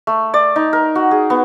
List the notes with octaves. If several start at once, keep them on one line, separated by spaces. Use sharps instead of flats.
A3
D5
D#4
A#4
F#4
G#4
B3